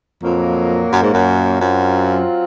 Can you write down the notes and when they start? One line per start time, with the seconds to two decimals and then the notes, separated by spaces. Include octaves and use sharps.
0.23 F2 A#2 F#3 A#3
0.92 F#2
1.03 G#2
1.14 F#2
1.61 F#2 F#3 C4 F4